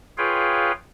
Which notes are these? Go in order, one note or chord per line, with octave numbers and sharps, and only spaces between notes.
F4 G#4 B4 C#5 F5 G5